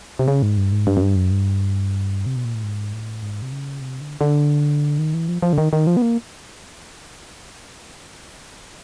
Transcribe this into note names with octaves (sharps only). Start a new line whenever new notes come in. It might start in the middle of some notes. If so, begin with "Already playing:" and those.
C3
C#3
G#2
G2
G#2
G2
F#2
G2
F#2
G2
C3
B2
A#2
A2
G#2
A2
G#2
C3
C#3
C3
D3
D3
D#3
E3
F3
F3
D3
D#3
D#3
F3
B3
A#3